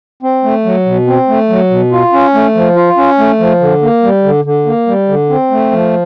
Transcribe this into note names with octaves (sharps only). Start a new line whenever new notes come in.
C4
A3
F#3
B2
C4
A3
F#3
B2
F4
C#4
A3
F3
F4
C#4
A3
F3
D3
A#3
G3
D3
D3
A#3
G3
D3
C4
A3
F3